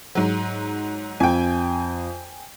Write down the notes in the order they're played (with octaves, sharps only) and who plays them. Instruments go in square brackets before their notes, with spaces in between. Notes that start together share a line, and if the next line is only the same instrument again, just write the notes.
[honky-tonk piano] G#2 F#3
[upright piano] F2 [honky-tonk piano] G5 G#5